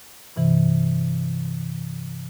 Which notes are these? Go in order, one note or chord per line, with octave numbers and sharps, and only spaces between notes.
G2 C3 E3